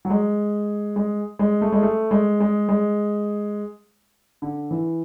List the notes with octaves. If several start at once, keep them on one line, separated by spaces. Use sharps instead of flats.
F#3
G#3
G#3
G#3
A3
G#3
A3
G#3
G#3
G#3
D3
E3